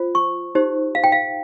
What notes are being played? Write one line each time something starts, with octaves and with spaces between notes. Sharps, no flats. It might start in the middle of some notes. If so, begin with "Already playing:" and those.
Already playing: F4 C5
C#6
D#4 G4 C5
F5
G5
F5